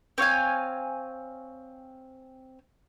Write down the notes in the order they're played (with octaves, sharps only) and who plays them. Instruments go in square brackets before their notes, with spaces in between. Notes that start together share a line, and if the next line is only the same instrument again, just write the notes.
[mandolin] C4 C#5 F5 G#5